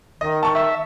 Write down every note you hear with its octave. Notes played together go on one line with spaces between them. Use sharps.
D#3 D#5
A5 C#6
E5